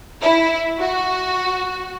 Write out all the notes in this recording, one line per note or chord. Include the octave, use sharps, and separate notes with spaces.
E4
F#4